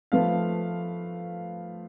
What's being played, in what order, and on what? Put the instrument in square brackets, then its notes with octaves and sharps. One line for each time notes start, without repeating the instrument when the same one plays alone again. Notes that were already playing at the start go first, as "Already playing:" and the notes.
[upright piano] F3 A3 F4 B4 F5